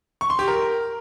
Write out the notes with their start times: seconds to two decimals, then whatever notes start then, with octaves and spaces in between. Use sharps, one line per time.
0.21 C#6
0.30 C6
0.39 G4
0.48 A#4